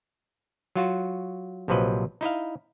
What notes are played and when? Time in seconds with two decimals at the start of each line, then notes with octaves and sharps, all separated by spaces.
0.76 F#3 F4 F#4
1.68 A#1 C3 F3 F#3 B4 D#5
2.21 D#4 E4 D#5 F5